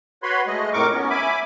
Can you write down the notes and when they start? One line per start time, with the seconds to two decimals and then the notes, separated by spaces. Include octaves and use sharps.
0.23 F#4 B4 C#5 B5 C6
0.47 G#3 A3 D#5
0.73 F2 A2 A#4 C#6 D6
0.92 B3 C#4
1.10 E5 G#5 B5 D6